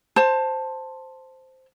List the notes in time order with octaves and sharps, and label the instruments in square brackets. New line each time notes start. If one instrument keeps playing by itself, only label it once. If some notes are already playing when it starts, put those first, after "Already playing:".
[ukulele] C5 A5